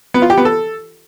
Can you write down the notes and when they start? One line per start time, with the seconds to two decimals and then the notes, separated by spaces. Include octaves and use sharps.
0.14 B3
0.22 F4
0.30 G4
0.38 B3
0.45 A4